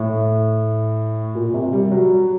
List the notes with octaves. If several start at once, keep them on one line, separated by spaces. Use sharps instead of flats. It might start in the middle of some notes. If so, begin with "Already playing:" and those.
Already playing: A2
A#2
C3
G3
F#3